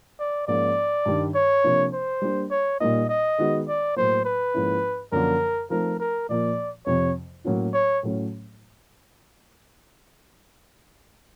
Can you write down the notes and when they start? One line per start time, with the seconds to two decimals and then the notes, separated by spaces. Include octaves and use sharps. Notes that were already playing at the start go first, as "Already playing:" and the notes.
0.19 D5
0.47 G#2 F3 A#3 C#4 D5
1.06 G2 D#3 G3
1.35 C#5
1.64 C3 F3 A#3 D4
1.93 C5
2.22 G3 A#3 D4
2.51 C#5
2.80 A#2 G3 A#3 D#4 D#5
3.09 D#5
3.38 D#3 G#3 B3 D#4 F#4
3.68 D5
3.96 A2 F#3 A#3 C5
4.25 B4
4.54 G#2 F3 A#3 C#4 E4
5.12 F#2 D3 F3 A#3 D4 A#4
5.70 F3 A3 C4 D#4 A#4
6.00 A#4
6.29 A#2 F3 A#3 D5
6.86 F2 C3 F3 C#5
7.44 A2 F#3 A#3 C#4 F#4
7.74 C#5
8.03 A2 F#3 A3 C#4